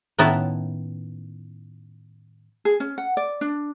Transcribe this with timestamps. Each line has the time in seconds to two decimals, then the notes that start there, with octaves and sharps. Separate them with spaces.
0.18 A2 D#3 B3 C#4 E4 A5
2.65 G#4
2.80 C#4
2.98 F#5
3.17 D5
3.41 D4